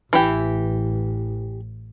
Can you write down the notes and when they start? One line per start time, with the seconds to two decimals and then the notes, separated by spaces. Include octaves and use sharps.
0.13 A1 E3 G4